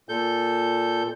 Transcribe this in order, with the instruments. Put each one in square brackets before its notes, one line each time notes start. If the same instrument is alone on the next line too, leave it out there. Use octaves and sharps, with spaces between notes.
[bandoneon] A#2 A4 G6